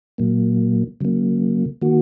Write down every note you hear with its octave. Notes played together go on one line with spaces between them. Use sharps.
A#2 F#3 A#3
C#3 F#3 A#3
D#3 A#3 F#4